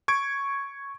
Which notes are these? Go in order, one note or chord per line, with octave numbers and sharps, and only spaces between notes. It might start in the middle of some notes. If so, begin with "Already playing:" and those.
C#6 G#6 D7